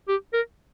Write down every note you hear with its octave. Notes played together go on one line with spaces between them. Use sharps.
G4
A#4